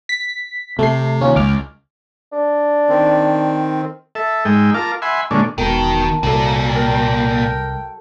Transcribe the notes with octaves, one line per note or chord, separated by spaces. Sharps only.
B6
C3 A3 C7
D#2 C#4 F4
C#2 D6 F6
D4
D#3 C4
A4 E5
G#2 G#3 D#4 G5 E6
F4 A#4 F5 A5 D6
E5 F#5 G#5 B5 C6
A#2 D3 G#3 A3 C#4 D4
E1 B2 D#3 A#4 A5
C2 A#2 F#3 A4
A#4 G5